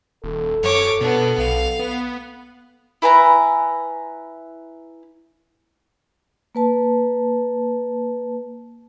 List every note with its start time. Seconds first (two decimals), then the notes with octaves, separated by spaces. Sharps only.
0.24 D#1 A4
0.63 F#2 C#5 D6
1.01 B2 B3 D4
1.38 B1 F5
1.79 B3
3.02 E4 B4 G#5 A#5
6.55 A#3 B4 A5